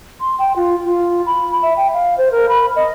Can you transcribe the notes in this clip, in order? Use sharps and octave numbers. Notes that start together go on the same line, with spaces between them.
C6
G5
F4
F4
B5
E5
G5
F5
C5
A#4
B5
D#5